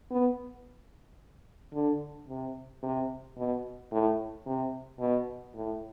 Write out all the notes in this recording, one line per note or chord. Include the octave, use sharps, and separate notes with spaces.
B3
D3
C3
C3
B2
A2
C3
B2
A2